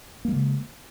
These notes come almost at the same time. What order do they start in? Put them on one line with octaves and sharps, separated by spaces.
A#3 G#3 C#3